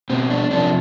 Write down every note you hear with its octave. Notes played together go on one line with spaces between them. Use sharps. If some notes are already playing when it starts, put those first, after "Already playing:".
B2 C4
D4
C3 F3 D4